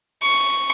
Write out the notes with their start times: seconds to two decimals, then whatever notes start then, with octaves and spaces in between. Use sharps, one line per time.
0.23 C#6